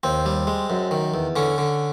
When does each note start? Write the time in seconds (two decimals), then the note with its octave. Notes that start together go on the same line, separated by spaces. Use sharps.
0.03 D#2 C4
0.26 G3
0.47 G#3
0.70 F#2
0.91 D#3
1.14 E2
1.36 D3 C#4
1.58 D3